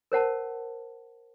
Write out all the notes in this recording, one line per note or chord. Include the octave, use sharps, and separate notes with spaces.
A#4 C5 F#5 A5